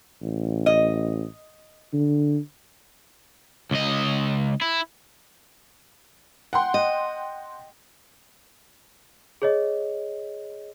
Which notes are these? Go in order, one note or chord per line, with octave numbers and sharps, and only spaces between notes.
A1
D#5
D3
C#2 D#5
E4
F#5 G5 C6
D#5
G#4 C#5 D#5